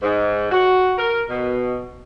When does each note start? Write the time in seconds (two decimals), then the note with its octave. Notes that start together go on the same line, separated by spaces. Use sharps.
0.02 G#2
0.51 F#4
0.98 A#4
1.29 B2